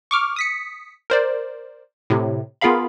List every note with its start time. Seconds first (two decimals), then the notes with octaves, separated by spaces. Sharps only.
0.11 C#6 D6 F6
0.36 D#6 B6 C#7
1.10 A#4 C5 D5
2.10 A2 C3
2.61 B3 F4 G#4 A#4 F5 B5